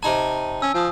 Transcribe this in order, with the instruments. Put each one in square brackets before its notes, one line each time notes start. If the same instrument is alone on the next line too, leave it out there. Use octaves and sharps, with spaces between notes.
[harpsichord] C3 D#4 G#5 [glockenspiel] A5
[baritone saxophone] C#4 [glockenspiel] E6
[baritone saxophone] F3 [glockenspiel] G#5 D#6